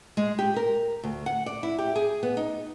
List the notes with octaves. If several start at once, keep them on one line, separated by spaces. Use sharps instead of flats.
G#3
G4
A#4
D2
F#5
D5
E4
G4
G#4
B3
D#4